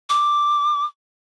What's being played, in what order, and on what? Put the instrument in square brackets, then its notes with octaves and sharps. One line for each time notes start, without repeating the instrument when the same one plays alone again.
[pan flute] D6